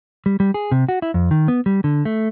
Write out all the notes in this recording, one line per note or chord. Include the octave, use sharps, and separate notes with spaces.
G3
G3
G#4
C3
F#4
E4
F2
D#3
B3
G3
D3
A3